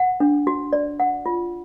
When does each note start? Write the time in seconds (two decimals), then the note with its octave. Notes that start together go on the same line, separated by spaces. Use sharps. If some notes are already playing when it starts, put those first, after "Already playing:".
Already playing: F#5
0.20 D4
0.47 F#4
0.73 D5
1.00 F#5
1.26 F4